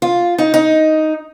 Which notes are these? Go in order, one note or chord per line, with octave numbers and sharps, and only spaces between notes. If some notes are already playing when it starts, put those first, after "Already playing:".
F4
D#4
D#4